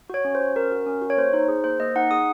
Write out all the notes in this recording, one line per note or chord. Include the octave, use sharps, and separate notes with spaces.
F#4 C#5
C#4
C5
F#4
C#4 A#4
F#4
C#4
F#4
C#5
A#3 C5
D#4 C5
G#4
A#3 C5
A#3 D#5
D#4 F#5
G#4 D#6